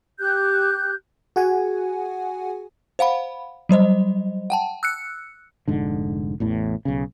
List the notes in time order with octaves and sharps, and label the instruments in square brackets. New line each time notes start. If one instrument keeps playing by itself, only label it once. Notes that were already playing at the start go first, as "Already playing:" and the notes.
[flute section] G4 F#6 G6
[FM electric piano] F#4 G#4 F#5 G#5
[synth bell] C5 F5 F#5 B5
F#3 G3 C5 D#5
F#5 G5 A5
E6 F#6 C#7
[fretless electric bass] F1 G#2 D3
A1 E2 A2
B1 C#3